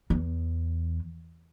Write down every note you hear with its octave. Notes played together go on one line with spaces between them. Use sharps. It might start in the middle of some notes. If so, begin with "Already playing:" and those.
E2